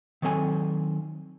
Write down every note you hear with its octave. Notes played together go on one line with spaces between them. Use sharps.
D#3 F#3 C4 A4 G#5